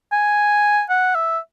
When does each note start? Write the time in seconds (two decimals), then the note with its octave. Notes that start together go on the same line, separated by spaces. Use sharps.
0.12 G#5
0.90 F#5
1.15 E5